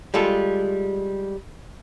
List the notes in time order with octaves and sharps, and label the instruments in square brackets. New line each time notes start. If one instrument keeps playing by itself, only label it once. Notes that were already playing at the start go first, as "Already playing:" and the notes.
[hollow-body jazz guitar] G3 G#3 F4 A4